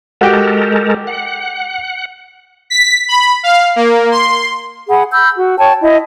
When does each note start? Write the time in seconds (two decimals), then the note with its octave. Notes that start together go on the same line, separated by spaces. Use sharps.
0.21 G#3 F#4 G4 A4 A#4 G5
1.07 F#5
2.70 B6
3.08 B5
3.43 F5
3.76 A#3
4.11 C6
4.90 G#4 F#5 B5
5.12 B5 E6 G6
5.37 F#4
5.58 C#5 G5 A5
5.81 E4 D#5